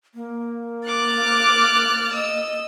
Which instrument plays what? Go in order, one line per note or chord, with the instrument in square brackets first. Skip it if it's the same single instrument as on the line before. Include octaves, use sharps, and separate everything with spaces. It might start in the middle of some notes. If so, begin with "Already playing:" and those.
[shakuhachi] A#3
[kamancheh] D6 [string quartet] F6 F#6 A6
[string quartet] D#5 E6